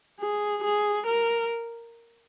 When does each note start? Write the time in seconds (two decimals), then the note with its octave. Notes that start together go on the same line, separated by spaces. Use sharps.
0.20 G#4
0.64 G#4
1.06 A#4